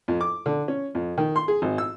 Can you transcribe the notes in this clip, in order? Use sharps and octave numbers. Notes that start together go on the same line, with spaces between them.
F2
D6
D3
C#4
F2
D#3
C6
G#4
G#1
E6